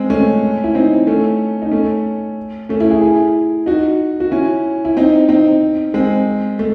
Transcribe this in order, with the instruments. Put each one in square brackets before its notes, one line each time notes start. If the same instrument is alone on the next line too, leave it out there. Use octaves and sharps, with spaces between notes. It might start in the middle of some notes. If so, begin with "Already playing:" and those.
Already playing: [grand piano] G#3 C4
A3 C#4
E4
C4 D#4
A3 C#4
D#4
A3 C#4
A3 C#4
C#4 E4
E4 G#4
E4 G#4
D#4 F#4
F#4
C#4 E4
E4
C4 D#4
C4 D#4
G#3 C4
A3